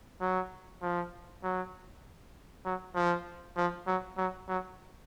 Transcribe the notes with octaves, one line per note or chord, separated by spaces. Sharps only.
F#3
F3
F#3
F#3
F3
F3
F#3
F#3
F#3